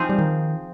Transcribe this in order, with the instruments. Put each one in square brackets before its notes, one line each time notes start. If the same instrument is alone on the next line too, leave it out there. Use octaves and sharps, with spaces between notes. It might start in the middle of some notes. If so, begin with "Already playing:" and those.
Already playing: [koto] F3 C4 D#4 G#4
[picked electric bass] G3
D#3